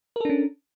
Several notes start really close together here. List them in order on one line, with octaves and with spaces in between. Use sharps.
A#4 A4 D4 C#4